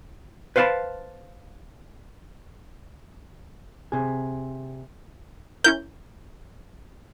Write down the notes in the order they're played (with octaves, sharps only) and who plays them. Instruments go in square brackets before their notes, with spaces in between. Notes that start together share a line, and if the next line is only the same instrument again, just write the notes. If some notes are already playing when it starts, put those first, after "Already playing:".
[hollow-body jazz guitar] B4 C5 F5 F#5 A5 B5
C3 G#4
[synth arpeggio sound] C#4 E4 A#4 [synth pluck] G6